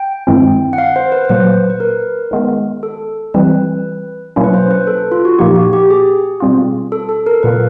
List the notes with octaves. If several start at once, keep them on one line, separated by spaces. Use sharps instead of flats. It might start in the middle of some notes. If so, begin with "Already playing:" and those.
Already playing: G5
G2 D#3 G#3 C4 E4
F#5
F5
C5
B4
C5
A#2 F#3 A#3 B4
B4
A#4
D#3 G#3 B3
A4
E3 G3 C4 B4
B2 F#3 A#3 C#4 E4
B4
C5
B4
A4
F4
F#4
A#2 F3 A#3 D#4 G4
F#4
G4
G#4
B2 G3 C4 F4
A4
A4
A#4
A#2 F#3 A#3 B4